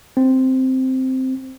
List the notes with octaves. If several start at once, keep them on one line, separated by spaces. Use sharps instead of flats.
C4